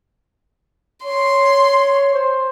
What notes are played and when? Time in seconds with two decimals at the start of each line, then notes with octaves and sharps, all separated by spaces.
1.05 C#5 C6
2.14 C5